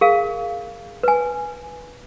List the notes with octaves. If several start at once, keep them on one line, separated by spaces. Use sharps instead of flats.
G#4 A#4 F5
B4 G#5